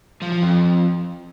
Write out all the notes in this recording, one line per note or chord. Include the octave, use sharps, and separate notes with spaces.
F3
F3
F2